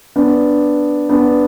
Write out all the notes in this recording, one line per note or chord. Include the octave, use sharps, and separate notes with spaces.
B3 D4
B3 D4